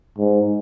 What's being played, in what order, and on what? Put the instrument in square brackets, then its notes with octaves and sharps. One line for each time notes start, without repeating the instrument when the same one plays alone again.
[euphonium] G#2